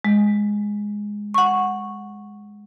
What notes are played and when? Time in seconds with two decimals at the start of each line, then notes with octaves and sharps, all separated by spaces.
0.04 G#3
1.34 F#5 C#6